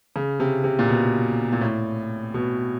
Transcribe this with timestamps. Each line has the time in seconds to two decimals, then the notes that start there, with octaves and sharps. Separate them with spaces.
0.16 C#3
0.40 C3
0.64 C3
0.79 A#2
0.89 B2
1.52 A#2
1.61 A2
2.34 B2